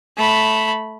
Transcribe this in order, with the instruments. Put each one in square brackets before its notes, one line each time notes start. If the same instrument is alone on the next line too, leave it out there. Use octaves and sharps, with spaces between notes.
[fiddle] A3 B5